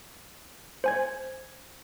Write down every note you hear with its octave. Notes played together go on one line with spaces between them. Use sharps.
C5 G#5 G#6